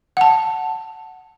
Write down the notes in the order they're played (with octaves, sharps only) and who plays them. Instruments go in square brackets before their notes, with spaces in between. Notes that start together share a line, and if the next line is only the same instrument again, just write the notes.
[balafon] F#5 A5